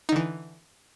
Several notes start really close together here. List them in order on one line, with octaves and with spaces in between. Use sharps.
D#4 D3 E3